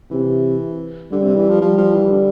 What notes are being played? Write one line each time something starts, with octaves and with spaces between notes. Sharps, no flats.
C3 E3
D3 G3
C3
E3
F3
F3 G3
F3
E3
D3